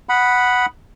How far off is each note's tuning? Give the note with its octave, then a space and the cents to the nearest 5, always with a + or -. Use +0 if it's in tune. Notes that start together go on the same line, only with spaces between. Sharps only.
F#5 +0 B5 +0 D#6 +0